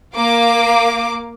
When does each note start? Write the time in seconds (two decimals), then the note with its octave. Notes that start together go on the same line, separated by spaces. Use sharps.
0.15 A#3 F5 D6